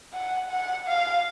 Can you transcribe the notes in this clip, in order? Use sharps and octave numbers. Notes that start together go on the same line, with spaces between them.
F#5
F#5
F5